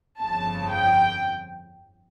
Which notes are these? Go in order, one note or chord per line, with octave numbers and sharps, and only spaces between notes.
G1 F2 C#3 F3 A5
G5